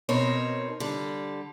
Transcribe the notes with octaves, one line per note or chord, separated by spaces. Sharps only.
B2 C4 D#4 A#4 C#5
D3 G3